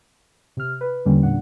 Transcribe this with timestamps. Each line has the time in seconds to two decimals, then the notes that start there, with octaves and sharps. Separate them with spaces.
0.57 C3 F6
0.81 B4
1.05 E2 D3 G3 A#3 C#4
1.23 A#2 D4 F#5